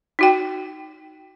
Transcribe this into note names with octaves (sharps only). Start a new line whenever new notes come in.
D#4 F#4 G5